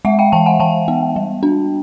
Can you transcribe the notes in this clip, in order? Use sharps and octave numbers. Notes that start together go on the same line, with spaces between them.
G#3 E5 F#5
F5 G5
E3 G5 A5
F#5 G#5
E3 G5 A5
B3
G3
D4